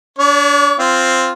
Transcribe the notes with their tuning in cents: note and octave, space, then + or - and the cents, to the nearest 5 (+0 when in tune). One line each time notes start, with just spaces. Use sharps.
D4 -30 C#5 +35
C4 +0 F4 +0